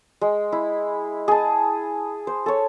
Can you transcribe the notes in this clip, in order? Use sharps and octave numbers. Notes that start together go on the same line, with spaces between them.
G#3
E4
G#4 A5
C5
A4 C#5